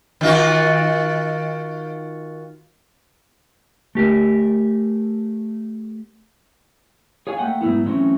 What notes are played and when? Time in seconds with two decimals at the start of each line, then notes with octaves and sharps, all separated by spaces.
0.21 D#3 F4 F#4
3.95 A3 G4 A#4
7.27 G#4 C#5 F5 G#5
7.38 A3 A#3 F#5 G5
7.61 G#2 F#3 A3 B3 E4
7.86 E3 F#3 A3 C4 C#4